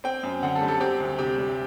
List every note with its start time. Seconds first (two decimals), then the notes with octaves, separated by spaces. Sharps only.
0.04 C4 G5
0.23 F#2
0.43 D3 F#5
0.55 A4
0.61 G3
0.68 A4
0.80 C4 G4
1.00 D2
1.18 C3 G4
1.38 G3